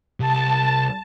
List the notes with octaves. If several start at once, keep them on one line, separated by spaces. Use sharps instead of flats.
C2 A5